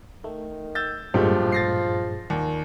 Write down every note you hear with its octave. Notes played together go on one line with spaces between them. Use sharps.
D#3 A3
E6 G6 A6
D1 G2 A#2 F3 G#3 A3 G4
A6 A#6 C7
D#2 A#2